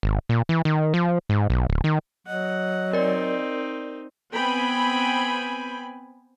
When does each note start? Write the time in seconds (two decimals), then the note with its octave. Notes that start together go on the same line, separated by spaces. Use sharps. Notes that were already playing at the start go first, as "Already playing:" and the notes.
0.03 G#1
0.29 A#2
0.49 E3
0.65 D#3
0.94 F3
1.29 G#2
1.50 B1
1.70 D1
1.84 D#3
2.27 F#3 D#5 F#5
2.93 C4 D#4 A#4 D5
4.33 B3 C4 G5 G#5 B5